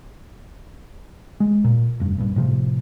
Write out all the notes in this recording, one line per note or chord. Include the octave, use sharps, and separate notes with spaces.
G#3
A#2
F1 G2
A#1 G2
A2 C3 D#3 F3